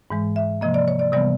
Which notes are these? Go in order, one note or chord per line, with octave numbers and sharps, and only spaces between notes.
G#2 E3 G#3
E5
C3 F3 A#3 D#5
D5
C#5
D5
C3 E3 G3 B3 D5